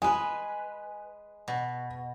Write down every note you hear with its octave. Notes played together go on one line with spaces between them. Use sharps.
G#3 B4 G#5
B2